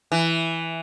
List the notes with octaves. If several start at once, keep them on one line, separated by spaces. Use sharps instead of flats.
E3